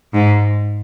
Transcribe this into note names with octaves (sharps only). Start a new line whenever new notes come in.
G#2